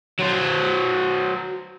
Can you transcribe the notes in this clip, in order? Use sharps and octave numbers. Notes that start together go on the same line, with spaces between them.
F#3 C5